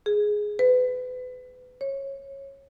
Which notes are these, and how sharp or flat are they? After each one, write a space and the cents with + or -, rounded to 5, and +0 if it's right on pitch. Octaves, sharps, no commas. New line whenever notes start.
G#4 +5
B4 +30
C#5 -15